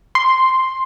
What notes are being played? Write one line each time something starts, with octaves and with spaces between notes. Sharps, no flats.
C6